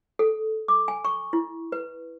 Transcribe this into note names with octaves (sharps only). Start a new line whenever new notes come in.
A4
D6
G#5
C#6
E4
B4